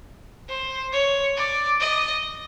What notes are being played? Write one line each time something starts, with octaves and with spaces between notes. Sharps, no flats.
C5
C#5
D5
D#5